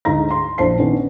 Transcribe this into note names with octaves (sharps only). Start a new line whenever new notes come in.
D2 G#2 D#4 A#5 A#6
C6
A#1 C5 A5 C7
D#3 B3 C#4 D4